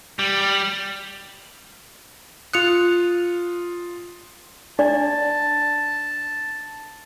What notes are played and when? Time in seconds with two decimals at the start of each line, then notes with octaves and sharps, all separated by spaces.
0.19 G3
2.53 F4 D#6 F#6 C#7 F7
4.79 D4 D5 A5